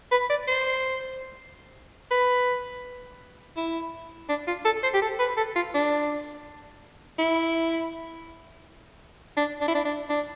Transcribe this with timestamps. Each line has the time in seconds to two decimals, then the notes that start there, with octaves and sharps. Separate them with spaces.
0.11 B4
0.30 D5
0.47 C5
2.11 B4
3.56 E4
4.29 D4
4.47 F4
4.65 A4
4.83 C5
4.94 G4
5.02 A4
5.19 B4
5.37 A4
5.56 F4
5.74 D4
7.19 E4
9.37 D4
9.61 D4
9.68 E4
9.75 D4
9.85 D4
10.09 D4